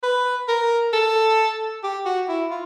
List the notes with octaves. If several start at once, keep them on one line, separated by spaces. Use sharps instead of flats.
B4
A#4
A4
G4
F#4
E4
F4